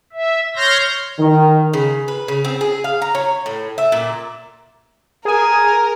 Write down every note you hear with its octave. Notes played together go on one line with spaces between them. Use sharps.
E5
C#5 C6 F6 G6 A#6
D#3
C#3
B4
C#3
C4
G#4
F5
A#5
C#5
A2
E5
A#2
G#4 A#4 G#5